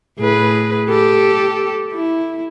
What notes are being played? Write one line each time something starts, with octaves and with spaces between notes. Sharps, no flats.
A2 G#4 B4
G4 A4
E4